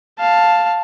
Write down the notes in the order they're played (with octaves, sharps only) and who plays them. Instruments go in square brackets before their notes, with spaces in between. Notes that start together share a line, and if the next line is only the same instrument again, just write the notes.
[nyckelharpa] F5 A5